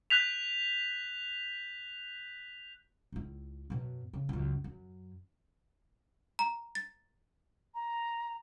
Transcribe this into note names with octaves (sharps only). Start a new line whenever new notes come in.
F#6 G6 B6 F7
C#2 E4
F#2 B2
C#3
C#2 F#2
F#2
A#5
A6
A#5